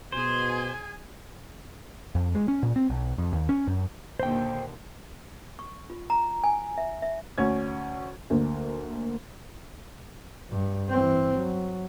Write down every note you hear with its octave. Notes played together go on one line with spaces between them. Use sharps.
B2 G#4 C5 G#5
F2
G#3
C#4
A#2
C4
B1
F2
D#2
C#4
F#2
D#2 A#2 D3 C5 G5
C#6
F4
A#5
G#5
E5
E5
D2 C#4 G#6
D2 A#3
G2
E3 C4
F#3